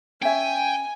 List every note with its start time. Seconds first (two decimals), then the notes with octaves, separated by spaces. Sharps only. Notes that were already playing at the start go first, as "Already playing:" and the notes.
0.23 C#4 E5 G5 G#5